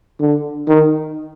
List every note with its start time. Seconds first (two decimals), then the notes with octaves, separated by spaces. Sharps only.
0.20 D3
0.68 D#3